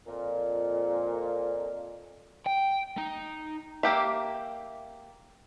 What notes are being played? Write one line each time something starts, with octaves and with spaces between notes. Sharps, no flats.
F2 A#2
G5
D#4
A#3 G4 E5